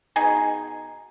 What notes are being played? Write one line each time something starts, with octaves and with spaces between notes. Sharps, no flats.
B2 D#4 G#4 G#5